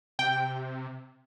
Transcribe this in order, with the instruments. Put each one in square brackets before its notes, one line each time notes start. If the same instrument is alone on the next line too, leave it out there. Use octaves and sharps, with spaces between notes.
[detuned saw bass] C3 [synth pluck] G5